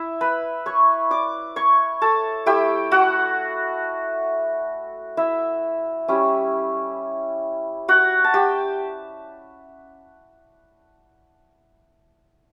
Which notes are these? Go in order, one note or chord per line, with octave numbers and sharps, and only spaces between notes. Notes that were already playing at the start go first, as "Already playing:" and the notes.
Already playing: E4 E5
B4 B5
C#5 C#6
D5 D6
C#5 C#6
A4 A5
A3 E4 G4 G5
F#4 F#5
E4 E5
G3 C#4 E4
F#4 F#5
A5
G4 G5